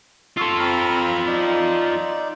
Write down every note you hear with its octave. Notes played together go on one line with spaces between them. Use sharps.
F4 A4 C6 C#6 E6
C4 A#5 B5 F6
D#4 D5